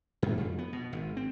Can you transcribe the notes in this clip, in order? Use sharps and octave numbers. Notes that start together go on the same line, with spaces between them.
F#2
F2
B3
B2
G#1
C4